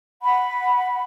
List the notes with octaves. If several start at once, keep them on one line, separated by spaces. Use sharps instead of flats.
F#5 B5